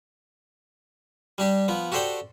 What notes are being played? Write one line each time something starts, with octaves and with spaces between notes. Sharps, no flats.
G3 D4 G4
F3 B3
F#4 G4 A4 C5 D5 G5